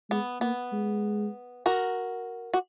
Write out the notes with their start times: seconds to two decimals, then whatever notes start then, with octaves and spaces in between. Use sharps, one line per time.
0.10 G#3 B3
0.41 A#3 B3
0.73 G#3
1.66 F#4 A#4
2.54 F#4